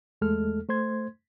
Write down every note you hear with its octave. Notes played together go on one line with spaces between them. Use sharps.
E2 G#3 A3 A4 F6
A3 C5 C6 G#6